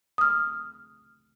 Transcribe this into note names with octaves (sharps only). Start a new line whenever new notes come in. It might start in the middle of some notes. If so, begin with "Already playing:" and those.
D#6 F6